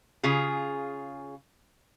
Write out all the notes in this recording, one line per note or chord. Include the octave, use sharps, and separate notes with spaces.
C#3 F4 G#4